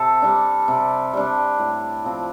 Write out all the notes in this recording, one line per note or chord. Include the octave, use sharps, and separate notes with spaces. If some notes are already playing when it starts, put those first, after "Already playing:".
Already playing: C3 A4
G3 D4
C3
G3 D4
A2
F3 C4